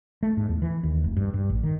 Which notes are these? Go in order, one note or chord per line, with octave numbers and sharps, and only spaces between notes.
A3
G#2
E2
E3
D#2
F1
G2
G2
A1
D#3